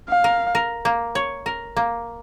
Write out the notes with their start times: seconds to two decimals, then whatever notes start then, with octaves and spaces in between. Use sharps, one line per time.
0.08 F5
0.24 A#4
0.55 A#4
0.85 A#3
1.15 C#5
1.46 A#4
1.77 A#3